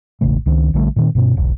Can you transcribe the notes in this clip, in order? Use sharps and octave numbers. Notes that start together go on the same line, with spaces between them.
E1 A1 C#3 A3
C#2 D#3 G3 C4
A#1 D3 G3 A3
A#2 D#3 C4
G2 B2 C#4
E1 B1